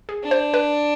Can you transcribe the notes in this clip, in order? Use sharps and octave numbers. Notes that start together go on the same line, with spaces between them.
G#4
D4
C5
B4